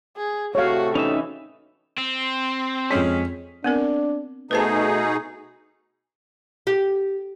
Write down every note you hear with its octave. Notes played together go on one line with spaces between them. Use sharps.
G#4
A2 C3 A3 F#4 C#5 F5
E3 C#4 D#4 E5
C4
F2 G#3 C#4 B6
B3 C4 D4 A#4
B2 A3 D#4 G#4 B4 C5 A5
G4